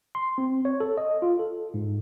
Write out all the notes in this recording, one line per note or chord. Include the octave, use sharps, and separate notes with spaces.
C6
C4
C#5
A4
D#5
F4
A4
G#2